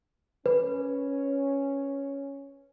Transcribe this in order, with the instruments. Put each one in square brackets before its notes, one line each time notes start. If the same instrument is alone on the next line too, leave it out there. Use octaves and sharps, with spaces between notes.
[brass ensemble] C#4 [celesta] B4